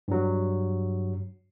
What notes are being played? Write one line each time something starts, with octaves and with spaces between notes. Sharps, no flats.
G2 F#3